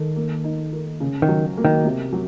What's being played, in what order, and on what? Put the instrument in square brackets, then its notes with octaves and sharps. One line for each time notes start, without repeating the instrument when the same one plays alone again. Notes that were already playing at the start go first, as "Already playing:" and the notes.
Already playing: [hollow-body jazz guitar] D#3 [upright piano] A4
[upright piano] A#3
D#4
A#4
C#3
[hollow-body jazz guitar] D#3
[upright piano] F#3
A#3
[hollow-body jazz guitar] D#3
[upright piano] C3
F#3